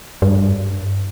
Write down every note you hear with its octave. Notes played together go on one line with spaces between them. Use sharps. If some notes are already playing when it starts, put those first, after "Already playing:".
G2